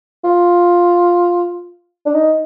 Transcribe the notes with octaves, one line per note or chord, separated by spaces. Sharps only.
F4
D4
D#4